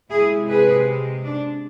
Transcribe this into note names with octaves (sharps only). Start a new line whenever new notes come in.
C3 G#3 C4 E4 G#4
G#4 B4
D4